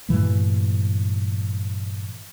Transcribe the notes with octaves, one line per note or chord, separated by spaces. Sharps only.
G2 A#2 E3 A3